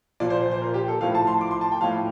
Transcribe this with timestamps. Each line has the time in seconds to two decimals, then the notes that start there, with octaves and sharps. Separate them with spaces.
0.20 A#2 F3 D5
0.30 C5
0.41 C5
0.51 C5
0.61 A#4
0.74 G4
0.88 A4
1.01 A2 F3 F5
1.15 A5
1.27 C6
1.41 D6
1.51 C6
1.61 A5
1.72 G5
1.81 A2 F3 F5